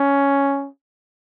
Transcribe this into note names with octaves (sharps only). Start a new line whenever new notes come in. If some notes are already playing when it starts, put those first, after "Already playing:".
Already playing: C#4